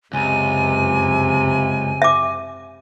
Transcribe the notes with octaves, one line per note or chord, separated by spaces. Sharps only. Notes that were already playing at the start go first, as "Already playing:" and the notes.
C#2 F#2 C3 G#5
E5 D6